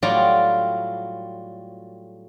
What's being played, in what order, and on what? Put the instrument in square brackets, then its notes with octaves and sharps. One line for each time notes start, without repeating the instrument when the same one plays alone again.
[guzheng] A2 F#3 G3 F4 D5 A#5